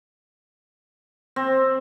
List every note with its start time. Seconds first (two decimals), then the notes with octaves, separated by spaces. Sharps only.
1.36 C4